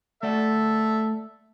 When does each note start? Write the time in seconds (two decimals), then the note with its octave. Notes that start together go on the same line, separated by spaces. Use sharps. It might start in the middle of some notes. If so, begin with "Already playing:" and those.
0.23 A3 A4 D5 E5 F#5